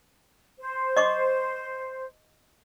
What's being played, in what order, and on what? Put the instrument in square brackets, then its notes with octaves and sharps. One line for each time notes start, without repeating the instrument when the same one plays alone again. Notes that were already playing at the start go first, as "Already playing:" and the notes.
[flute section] C5
[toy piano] D#5 C#6 D6